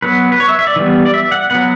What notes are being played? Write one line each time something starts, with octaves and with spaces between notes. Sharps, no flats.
F#3 B3 B4
B4
C#5
E5
E5
D5
E3 G3 B3
D5
E5
F#5
F#3 B3 F#5